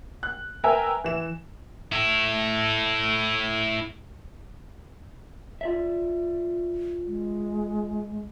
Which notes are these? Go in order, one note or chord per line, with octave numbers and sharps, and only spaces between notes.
F#6
A#4 B4 E5 G5 G#5 A#5
E3 E7
E4 A4
F4 D5 E5
G#3